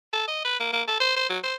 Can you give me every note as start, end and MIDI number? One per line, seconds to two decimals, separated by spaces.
0.13 0.25 69
0.28 0.42 75
0.45 0.58 71
0.60 0.70 58
0.73 0.82 58
0.88 0.97 69
1.00 1.13 72
1.16 1.28 72
1.29 1.38 54
1.44 1.55 72